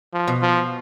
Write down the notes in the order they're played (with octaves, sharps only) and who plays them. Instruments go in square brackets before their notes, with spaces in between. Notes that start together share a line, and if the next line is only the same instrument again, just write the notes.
[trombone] F3
[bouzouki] B2
[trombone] F3